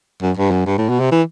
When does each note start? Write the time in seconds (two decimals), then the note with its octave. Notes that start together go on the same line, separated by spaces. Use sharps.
0.22 F#2
0.37 G2
0.51 F#2
0.66 G2
0.78 A2
0.89 B2
1.00 C3
1.12 E3